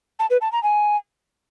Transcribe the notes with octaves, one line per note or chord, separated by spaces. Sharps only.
A5
B4
A5
A#5
G#5